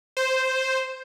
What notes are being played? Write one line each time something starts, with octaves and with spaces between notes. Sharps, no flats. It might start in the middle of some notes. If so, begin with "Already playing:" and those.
C5